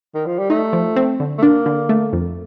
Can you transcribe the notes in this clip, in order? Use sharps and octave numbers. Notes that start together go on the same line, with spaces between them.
D#3
F3
G3
A3 D#4
F3
C4
D3
A3
A#3 D4
D3
A3
F2